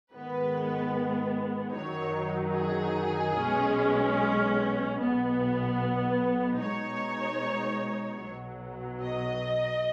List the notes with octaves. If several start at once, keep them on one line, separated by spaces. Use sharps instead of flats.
G#2 D#3 G#3 B3 B4
F#2 D#3 F#3 D#4 C#5
G#4
B1 B2 G#3 C#4
B1 B2 B3
B2 G#3 D#4 C#5
B1 B2 F#3
D#5